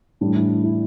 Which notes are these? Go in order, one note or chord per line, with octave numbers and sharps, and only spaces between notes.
A2 E3 G3 D4
E4
E4